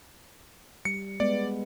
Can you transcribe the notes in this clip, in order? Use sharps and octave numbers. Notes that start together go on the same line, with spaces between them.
G3 C#7
G#3 B3 D5